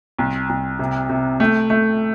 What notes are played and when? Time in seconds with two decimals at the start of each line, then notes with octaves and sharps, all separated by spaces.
0.19 C2
0.49 C2
0.79 C3
1.09 C3
1.40 A3
1.70 A3